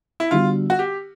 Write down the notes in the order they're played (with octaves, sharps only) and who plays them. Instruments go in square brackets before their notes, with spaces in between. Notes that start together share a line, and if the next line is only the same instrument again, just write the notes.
[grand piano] E4
[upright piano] D3 G3 B3 D4 F#4 [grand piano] F4
[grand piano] F#4
G4